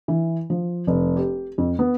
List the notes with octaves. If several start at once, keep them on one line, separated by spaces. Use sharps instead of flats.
E3
F3
F1
G4
F2
B3